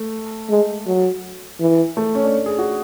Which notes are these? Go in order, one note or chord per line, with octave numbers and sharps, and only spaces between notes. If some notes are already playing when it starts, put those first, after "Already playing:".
Already playing: A3
G#3
F#3
E3
A3
C#4
D4
G#4
F#4